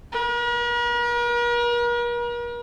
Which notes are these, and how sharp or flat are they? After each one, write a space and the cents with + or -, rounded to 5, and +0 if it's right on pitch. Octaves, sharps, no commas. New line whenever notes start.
A#4 +45